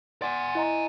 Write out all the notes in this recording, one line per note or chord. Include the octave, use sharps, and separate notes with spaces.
D5 F#5 G#5 C6 A6
E4 D#5 A#5